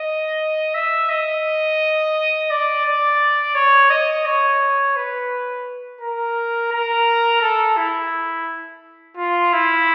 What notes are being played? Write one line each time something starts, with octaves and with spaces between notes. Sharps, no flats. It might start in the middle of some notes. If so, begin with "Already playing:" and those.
Already playing: D#5
E5
D#5
D5
D5
C#5
D#5
C#5
B4
A#4
A#4
A4
E4
F4
E4